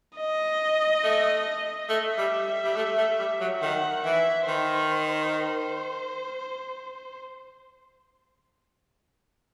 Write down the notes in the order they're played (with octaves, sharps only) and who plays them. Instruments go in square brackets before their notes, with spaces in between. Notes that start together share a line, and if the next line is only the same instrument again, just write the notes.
[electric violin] D#5
[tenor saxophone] A3
[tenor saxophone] A3 [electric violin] E5
[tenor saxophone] G3
G3
A3
A3
G3
F#3
[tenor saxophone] D#3 [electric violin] F#5
[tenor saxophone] E3 [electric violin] E5
[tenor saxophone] D#3 [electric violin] C5